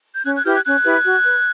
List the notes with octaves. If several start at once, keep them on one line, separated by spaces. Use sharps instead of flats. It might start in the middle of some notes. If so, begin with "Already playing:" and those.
G6
C#4 F#6 G#6
F#6 G#6
E4 G4 B4 F6 G6
F#6 G#6
C#4 F#6 G#6
E4 G4 B4
F#4
B4